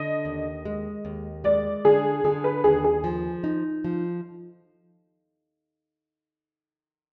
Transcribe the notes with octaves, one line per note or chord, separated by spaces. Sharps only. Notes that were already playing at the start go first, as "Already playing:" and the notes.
Already playing: D3 D#5
D#2
G#3
D#2
G#3 D5
D3 G#4
D3 G#4
B4
D#2 G#4
G#4
F3
D#4
F3